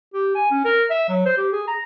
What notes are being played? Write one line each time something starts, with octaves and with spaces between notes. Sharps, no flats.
G4
G#5
C#4
A#4
E5
F#3
C5
G4
G#4
A#5